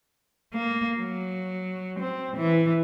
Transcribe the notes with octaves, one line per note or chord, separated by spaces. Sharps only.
A#3
F#3
C4
E3